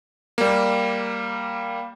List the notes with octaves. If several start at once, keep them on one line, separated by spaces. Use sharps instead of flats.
G3 A#3